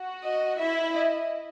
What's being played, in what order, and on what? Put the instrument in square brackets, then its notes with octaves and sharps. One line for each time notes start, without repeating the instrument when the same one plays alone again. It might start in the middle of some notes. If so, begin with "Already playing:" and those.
Already playing: [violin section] F#4
[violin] D#5
[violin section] E4 [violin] E5
[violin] D#5